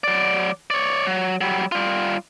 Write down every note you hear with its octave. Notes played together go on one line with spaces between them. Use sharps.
F#3 D5
C#5 D5
F#3
F#3 G3
G3 F4